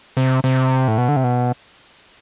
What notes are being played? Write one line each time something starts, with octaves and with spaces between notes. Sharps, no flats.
C3
C3
A2
B2
D3
C3
B2